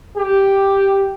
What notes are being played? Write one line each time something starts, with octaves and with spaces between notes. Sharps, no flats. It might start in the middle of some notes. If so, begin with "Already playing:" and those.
G4